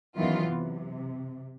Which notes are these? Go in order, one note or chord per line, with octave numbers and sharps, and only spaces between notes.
F#2 D#3 E3 F#3 B3 F4
C3